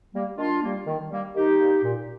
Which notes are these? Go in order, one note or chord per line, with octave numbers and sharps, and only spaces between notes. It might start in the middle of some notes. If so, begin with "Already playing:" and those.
G3 A#3
D#3 D4 F4
G3 A#3
D#3
G3 A#3
D#3 D#4 G4
G3 A#3
A#2